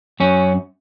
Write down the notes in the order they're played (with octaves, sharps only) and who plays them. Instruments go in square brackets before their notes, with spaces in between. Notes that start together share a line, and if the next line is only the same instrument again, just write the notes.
[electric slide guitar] F#2 C#4